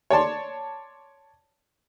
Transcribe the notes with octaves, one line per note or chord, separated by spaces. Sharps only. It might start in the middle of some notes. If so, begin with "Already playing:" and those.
C#5 D5 A5 C6